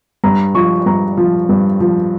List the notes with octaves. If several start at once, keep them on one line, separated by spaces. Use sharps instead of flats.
G2 A#5
F3 C#6
G2 A#5
F3
G2
F3